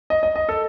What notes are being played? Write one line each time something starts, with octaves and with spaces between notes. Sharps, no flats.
D#5
D#5
D#5
A4